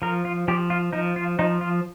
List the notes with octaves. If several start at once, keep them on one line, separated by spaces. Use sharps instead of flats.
F3 A#4
F4
F3 G4
F4
F3 D#4
F4
F3 D#4
F4